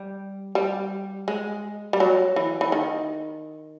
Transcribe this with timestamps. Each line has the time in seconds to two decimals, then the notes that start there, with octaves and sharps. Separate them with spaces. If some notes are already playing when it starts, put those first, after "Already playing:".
Already playing: G3
0.55 G3
1.28 G#3
1.93 G3
2.00 F#3
2.36 E3
2.61 E3
2.72 D#3